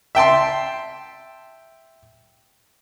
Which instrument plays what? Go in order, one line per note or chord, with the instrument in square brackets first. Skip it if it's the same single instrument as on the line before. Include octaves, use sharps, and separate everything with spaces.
[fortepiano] E5 G5 A5 C6